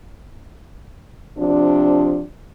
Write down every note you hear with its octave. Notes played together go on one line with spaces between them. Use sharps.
C3 F3 D4